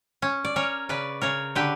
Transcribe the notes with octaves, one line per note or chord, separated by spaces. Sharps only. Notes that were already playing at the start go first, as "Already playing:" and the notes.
C#4
D5
C#4 A#4 C#5
C#3 B4 D5
C#3 A#4 C#5
D3 G4 B4